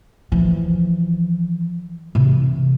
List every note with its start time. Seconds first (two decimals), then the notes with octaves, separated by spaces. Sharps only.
0.32 E3 F3
2.15 C3 E3